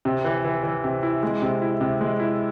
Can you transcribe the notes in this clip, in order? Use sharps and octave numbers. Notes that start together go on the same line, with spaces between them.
C3
E3
E3
E3
C3
E4
G#3
C3
E4
C3
G#3
E4